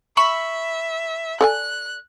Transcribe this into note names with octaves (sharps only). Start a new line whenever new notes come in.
E5 B5 C#6 E6
A4 D5 G#5 F#6